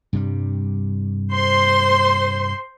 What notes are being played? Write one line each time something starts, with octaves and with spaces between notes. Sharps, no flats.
G2 C3 G3
C5 C6